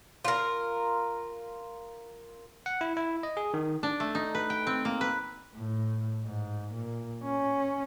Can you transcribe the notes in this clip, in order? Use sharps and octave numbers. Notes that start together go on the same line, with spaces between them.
F4 A#4
F#5
E4
E4
D#5
G#4
D#3
D4
A3
D#4
B4
G5
C4
A#3
B4
A2
G#2
A#2
C#4